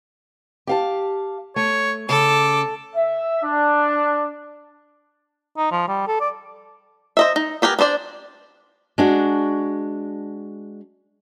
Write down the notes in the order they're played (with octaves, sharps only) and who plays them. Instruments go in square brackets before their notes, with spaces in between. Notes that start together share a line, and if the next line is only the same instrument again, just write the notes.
[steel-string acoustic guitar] G4 F5 A5
[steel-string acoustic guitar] A3 [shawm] C#5
[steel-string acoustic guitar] C#3 [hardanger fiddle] A4 [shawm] D6
[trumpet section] E5
D4
[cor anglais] D#4
F3
G3
A4
D5
[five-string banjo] C5 D#5 E5
D#4
B3 G4 A#4 G#5
B3 D4 C5 D5
[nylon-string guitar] G#3 D4 F#4